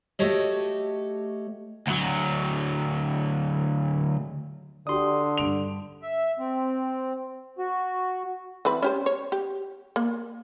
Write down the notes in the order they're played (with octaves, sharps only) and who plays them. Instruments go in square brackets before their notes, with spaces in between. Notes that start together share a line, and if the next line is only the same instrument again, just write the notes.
[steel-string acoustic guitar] A3 F#4 G4 A4 C#5 D#5
[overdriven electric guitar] D2 F#3
[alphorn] D3 [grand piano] D4 F#4 G4 [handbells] C6 D#6
[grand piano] G2 D7 F7
[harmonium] E5
C4
F#4
[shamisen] E3 C4 B4
C#4 G4 C5
C#5
G4
A#3